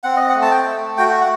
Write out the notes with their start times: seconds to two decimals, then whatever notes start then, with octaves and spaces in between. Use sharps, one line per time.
0.03 C4 F#5
0.17 D#5
0.29 F#5
0.35 A3
0.42 A5
0.51 G5
0.67 A3
0.97 F#4 G5
1.21 F#5